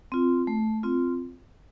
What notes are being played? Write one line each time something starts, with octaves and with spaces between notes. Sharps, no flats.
C4 F4
A3
C4 F4